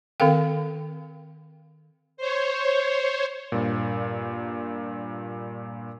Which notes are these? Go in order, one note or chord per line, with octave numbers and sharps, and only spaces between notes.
D#3 C4 A4 A#4 F5 G5
C5 C#5
G2 A#2